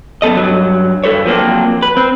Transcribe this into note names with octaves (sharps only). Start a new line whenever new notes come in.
F#2 B3 A4 D#5
G2 F#3
G2 A4 B4 C#5
F3 F#3 A#3 C4 D4
B4
C4